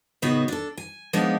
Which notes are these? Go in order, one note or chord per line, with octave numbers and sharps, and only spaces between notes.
A2 C#3 B3 D#4 F#4 G#4
D4 A4
G#5
F3 G#3 A#3 B3 D4 D#4